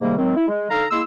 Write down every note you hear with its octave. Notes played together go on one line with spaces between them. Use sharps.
G#2 C3 D#3 G3 A#3
D#3 F#3 G#3 C4
E4
G#3
D3 D#4 A4 F5 A#5
G#3 A#3 E4 C6 E6